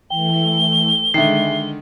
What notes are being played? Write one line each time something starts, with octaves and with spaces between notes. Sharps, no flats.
E3 A3 G5 G7
D3 D#3 G#3 E5 C7